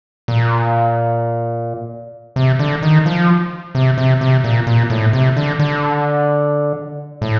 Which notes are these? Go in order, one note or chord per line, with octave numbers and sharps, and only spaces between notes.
A#2
C3
D3
D#3
F3
C3
C3
C3
A#2
A#2
A2
C3
D3
D3
A2